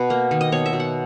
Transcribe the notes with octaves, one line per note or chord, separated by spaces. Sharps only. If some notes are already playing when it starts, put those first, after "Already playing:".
Already playing: B2 B4
A#3
D#3
D#5
B2 C#5
E5
B2
F#5